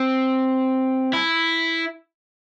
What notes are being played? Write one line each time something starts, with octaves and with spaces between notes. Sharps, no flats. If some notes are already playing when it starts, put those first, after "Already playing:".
Already playing: C4
E4